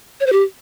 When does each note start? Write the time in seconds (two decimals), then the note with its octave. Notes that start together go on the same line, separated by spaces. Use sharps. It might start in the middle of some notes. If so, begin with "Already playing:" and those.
0.20 C#5
0.26 C5
0.32 G4